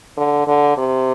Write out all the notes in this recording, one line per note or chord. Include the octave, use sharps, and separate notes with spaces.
D3
D3
C3